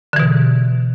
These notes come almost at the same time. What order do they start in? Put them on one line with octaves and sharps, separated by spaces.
D3 E3 B2